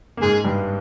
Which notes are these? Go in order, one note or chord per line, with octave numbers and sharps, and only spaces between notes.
A#3
G#2 G#3 G#4
G2 G3